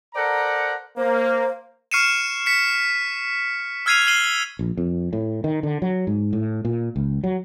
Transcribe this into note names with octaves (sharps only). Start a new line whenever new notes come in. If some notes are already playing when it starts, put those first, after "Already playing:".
A4 A#4 C5 D5 F#5 A#5
A#3 C5
C#6 F6 C7 C#7 D#7 E7
B6 C#7
E6 F6 G#6 C7 D#7 F7
F6 C7 D#7 F#7 G7
A#1
F2
A2
D#3
D3
F#3
G#2
A2
A#2
C#2
F#3